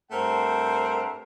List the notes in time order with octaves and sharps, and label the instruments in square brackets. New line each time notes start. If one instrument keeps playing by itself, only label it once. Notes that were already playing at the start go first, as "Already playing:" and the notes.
[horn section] G2 A3 C4 A#4 C5 F#5